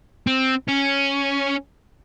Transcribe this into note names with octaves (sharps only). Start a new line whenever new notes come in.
C4
C#4